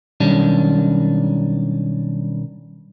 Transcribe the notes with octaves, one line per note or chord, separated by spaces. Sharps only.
B1 D#3 G3 C#4 D4